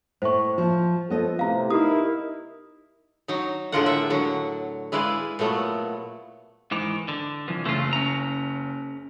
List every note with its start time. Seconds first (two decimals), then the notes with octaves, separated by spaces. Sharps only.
0.22 A2 C5 C#6
0.58 F3
1.10 F3 B3 A4 D#5
1.39 A2 C3 F5 A#5
1.70 D#4 E4 G4 A#4 D#6
3.28 F#3 D#4
3.72 A2 D3 G#3 F4 A#4 F#5
3.86 E5
4.10 D3 F#3
4.92 G#3 E4 B4 D5 F5 G#5
5.39 A#2 F#3 A3 B3
6.71 G#2 D#3 E3 D6 F7
7.08 D3
7.48 C2 E3 F3
7.65 F#1 A3 F4
7.93 C#4 A#5